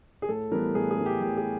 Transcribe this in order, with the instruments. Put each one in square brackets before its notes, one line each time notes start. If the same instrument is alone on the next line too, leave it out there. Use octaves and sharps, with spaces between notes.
[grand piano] G#4
A2 A4
E3 G3 B3 A#4
A2 G#4
G#4
E3 G3 B3
G4
A2 G4
G#4